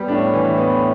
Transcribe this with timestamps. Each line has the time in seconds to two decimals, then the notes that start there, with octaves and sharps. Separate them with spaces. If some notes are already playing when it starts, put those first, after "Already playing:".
Already playing: G3 B3
0.08 A2 D4
0.34 E3
0.58 B3